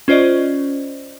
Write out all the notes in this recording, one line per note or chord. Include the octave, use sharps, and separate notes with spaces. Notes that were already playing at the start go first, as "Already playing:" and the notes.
C#4 F4 C5 D5 D#5